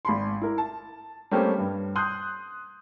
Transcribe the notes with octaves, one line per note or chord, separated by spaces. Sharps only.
G#1 B5 C6
E4 A#4
A5
G3 A3 A#3 C4 C#4 G4
G2
C6 D#6 F#6 G6